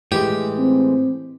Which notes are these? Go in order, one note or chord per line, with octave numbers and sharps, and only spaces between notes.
A2 E3 G#3 G4
C4